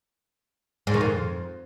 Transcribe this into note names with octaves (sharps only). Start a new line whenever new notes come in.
G#2
D#3
F2